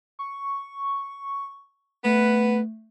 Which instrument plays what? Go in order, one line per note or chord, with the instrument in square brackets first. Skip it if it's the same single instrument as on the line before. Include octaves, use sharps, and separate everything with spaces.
[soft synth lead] C#6
[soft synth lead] A3 [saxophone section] B3 B4